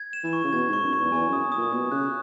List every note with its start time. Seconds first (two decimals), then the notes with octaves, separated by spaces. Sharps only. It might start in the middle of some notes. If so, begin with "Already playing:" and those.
Already playing: G#6
0.13 E7
0.23 E3
0.33 C#6
0.44 C#3
0.53 B2 G#6
0.68 G#2
0.73 C#6
0.83 F#2
0.93 E2 C#6
1.12 E2 G#5
1.28 F#2
1.33 D#6
1.52 D#6
1.57 A#2
1.72 B2 D#6
1.91 C#3 F#6